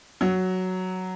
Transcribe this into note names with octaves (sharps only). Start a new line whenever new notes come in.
F#3